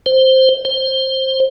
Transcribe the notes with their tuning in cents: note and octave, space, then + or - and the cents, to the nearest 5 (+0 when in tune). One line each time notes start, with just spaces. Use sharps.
C5 +0
C5 +15